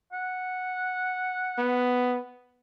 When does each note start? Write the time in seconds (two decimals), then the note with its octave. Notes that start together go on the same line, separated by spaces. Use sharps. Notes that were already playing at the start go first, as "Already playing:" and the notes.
0.13 F#5
1.59 B3